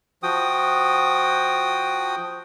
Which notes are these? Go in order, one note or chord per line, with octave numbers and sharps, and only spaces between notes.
F3 F#4 G5 D#6